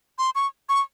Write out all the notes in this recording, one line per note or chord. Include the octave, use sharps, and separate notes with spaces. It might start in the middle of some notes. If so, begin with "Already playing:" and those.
C6
C#6
C#6